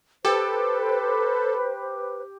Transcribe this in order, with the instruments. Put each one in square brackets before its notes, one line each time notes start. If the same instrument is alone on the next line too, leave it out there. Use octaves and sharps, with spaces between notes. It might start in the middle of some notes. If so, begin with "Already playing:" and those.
[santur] G4 [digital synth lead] A4 [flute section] B4 C5